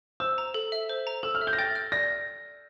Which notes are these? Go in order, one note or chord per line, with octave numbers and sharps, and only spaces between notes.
C5 E6
A#5
A4
E5
C5
A#5
A4 E6
F6
E5
G6
A#6
G5 A6
F6
D5 A#6